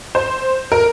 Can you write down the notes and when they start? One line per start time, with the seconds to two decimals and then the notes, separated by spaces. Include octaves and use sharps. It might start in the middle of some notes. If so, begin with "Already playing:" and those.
0.15 C5
0.72 A#4